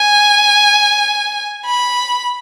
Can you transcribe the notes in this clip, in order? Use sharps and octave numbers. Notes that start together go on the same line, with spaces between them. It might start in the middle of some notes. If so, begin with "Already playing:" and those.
Already playing: G#5
B5